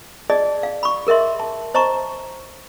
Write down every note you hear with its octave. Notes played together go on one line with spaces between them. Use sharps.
G#4 D5 D#5 A5
F5
B5 C#6
G#4 A#4 D#5 E5 C6
A5
C5 D#5 A5 A#5 C#6